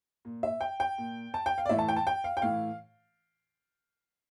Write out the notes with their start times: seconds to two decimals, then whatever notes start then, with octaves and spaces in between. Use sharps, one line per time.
0.25 A#2
0.43 E5
0.61 G5
0.80 G5
0.98 A#2
1.34 A5
1.46 G5
1.58 F5
1.65 D5
1.69 A2 E3 E5
1.79 A5
1.89 G5
1.96 A5
2.07 G5
2.24 F5
2.37 G5
2.42 A2 E3 F5